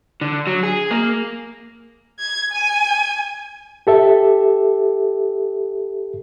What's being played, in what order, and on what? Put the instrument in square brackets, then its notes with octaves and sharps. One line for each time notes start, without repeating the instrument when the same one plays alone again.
[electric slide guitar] D3
F#3
G#4
A#3
[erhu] G#6
G#5
[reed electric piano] G4 A4 E5